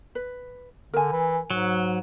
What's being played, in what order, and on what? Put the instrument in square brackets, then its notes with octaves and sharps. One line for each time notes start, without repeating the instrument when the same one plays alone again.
[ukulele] B4
[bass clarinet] D3 [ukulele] A#4 G#5
[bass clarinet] E3
[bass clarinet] G#2 [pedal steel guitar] F#3